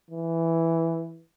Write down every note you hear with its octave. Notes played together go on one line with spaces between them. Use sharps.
E3